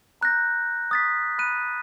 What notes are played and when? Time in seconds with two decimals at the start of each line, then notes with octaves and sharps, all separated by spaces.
0.21 A#5 F#6 G6 A#6
0.91 D#6 A6 B6
1.38 B5 F#6 D#7